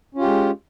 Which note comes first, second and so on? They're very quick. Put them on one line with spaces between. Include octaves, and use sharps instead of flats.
C#4 F4 G4 G#3